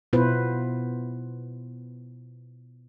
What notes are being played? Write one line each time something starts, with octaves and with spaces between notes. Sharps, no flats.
B2 B3 E4 F4 B4 C5